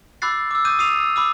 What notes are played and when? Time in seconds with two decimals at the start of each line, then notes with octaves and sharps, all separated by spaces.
0.22 B5 D6 E6 F#6 A6 C7
0.51 D6 E6
0.65 D6 D#6 F#6 G6 D#7
0.79 D#6 C7 D#7 F7
1.00 E6
1.16 B5 D6 E6